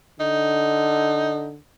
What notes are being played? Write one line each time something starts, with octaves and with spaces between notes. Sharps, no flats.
D3 D#4